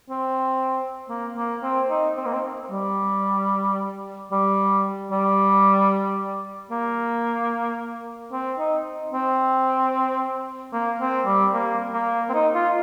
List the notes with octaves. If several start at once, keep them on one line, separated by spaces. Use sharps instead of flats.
C4
A#3
A#3
C4
D#4
C4
A#3
C4
G3
G3
G3
A#3
C4
D#4
C4
A#3
C4
G3
A#3
A#3
C4
D#4
F4